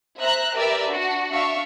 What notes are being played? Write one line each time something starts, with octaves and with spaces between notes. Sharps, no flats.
C5 E5 A#5 F#6
G4 A#4 B4 D5 E5
D4 F#4
D4 E5 F5 C#6